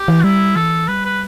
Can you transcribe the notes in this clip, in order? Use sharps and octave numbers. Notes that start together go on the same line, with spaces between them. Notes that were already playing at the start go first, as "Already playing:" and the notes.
Already playing: G4
E3
G3 E4
E3 A4
G3 B4
B4